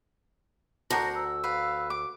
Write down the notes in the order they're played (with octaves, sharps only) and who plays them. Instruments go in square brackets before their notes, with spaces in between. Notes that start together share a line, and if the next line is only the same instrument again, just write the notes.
[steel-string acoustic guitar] D2 [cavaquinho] A#4 C5 F#5 [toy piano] A5 A#5 [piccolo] A#6
[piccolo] E6
[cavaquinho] B4 F5
D6